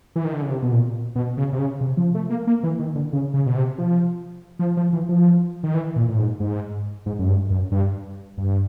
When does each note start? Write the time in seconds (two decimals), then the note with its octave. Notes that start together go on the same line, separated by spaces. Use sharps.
0.16 E3
0.25 D#3
0.33 D3
0.42 C#3
0.50 C3
0.62 B2
0.72 A#2
1.16 B2
1.37 C#3
1.53 C3
1.59 C#3
1.81 C3
1.97 F3
2.15 A3
2.30 A#3
2.47 A#3
2.63 E3
2.79 D#3
2.95 D3
3.13 C#3
3.34 C#3
3.46 B2
3.56 C3
3.78 F3
4.59 F3
4.77 F3
4.93 E3
5.09 F3
5.63 D#3
5.74 E3
5.96 A#2
6.09 A2
6.18 G#2
6.40 G#2
7.06 G#2
7.19 F#2
7.28 G2
7.50 F#2
7.72 G2
8.38 G2